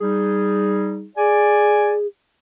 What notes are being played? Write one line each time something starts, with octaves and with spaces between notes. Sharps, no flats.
G3 D#4 G#4
G#4 D5 G#5